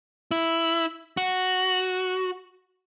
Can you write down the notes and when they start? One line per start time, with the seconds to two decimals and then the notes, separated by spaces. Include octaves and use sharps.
0.31 E4
1.17 F#4